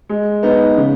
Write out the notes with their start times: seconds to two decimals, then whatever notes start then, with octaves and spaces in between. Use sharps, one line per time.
0.09 G#3
0.43 B3 D#4
0.77 C#3